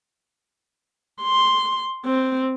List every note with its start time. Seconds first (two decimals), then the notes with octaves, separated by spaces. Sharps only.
1.22 C6
2.05 C4